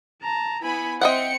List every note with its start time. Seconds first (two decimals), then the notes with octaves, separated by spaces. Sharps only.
0.22 A5 A#5
0.62 B3 E4 G#5 B5
1.01 C4 D#5 E5 F#5 G5 C#7